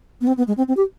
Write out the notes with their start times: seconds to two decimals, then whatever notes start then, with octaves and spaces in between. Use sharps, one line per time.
0.21 B3
0.27 C4
0.37 B3
0.47 G#3
0.57 C4
0.68 C4
0.77 G4